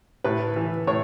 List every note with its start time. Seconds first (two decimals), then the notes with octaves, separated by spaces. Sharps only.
0.24 A2 B4
0.56 E3
0.87 A2 C#5